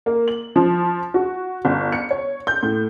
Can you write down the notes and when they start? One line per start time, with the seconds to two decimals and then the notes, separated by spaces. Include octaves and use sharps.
0.06 A#3
0.28 F#7
0.56 F3
1.14 F#4
1.65 G1
1.92 C#7
2.11 C#5
2.47 G6
2.63 A2